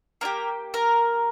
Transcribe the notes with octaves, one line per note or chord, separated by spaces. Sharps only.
A#3 D4 G4 A#4
A#4